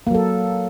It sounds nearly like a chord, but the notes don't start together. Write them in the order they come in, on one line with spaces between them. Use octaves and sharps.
A#3 F#3 A4